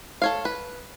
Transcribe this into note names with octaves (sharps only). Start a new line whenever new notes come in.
A4 C#5 F5
B4